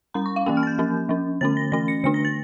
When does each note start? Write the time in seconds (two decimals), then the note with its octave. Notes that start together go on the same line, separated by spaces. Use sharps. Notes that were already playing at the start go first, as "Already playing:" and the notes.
0.14 G3 C#4 A#5
0.26 C#6
0.36 F5
0.46 E3 A#3 C#4 G5
0.57 F6
0.63 A6
0.67 G6
0.78 F3 A#3 C#4
1.09 F3 C#4
1.41 D3 A3 C#4 A6
1.57 A#6
1.72 E3 A3 C#4 A#6
1.88 C#7
2.04 D3 A3 D4 C#7
2.14 A#6
2.25 A6